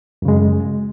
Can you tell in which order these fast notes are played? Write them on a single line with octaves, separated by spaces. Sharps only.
F#2 C#3 G#3